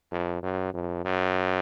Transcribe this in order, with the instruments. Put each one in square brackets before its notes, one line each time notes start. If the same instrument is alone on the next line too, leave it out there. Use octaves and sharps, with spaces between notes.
[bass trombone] F2
F#2
F2
F#2